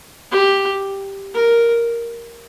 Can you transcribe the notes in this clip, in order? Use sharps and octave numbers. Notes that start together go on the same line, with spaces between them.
G4
A#4